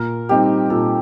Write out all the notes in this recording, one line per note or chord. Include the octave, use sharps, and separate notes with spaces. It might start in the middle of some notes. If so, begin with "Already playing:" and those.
Already playing: A#2 A#4
G3 C4 D#4 G4
A#2 A4